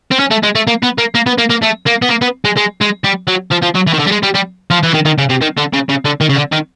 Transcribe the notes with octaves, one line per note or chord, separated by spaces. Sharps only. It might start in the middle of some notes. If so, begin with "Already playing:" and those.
C4
C#4
A3
G#3
A3
A#3
B3
A#3
A#3
B3
A#3
A#3
A3
A#3
B3
A#3
B3
G#3
G#3
G#3
G3
F#3
F3
F3
F#3
E3
D#3
D3
G3
G#3
G3
G3
F3
E3
D#3
D#3
C#3
C3
D#3
D3
C#3
C#3
D3
D#3
C#3
D3
D#3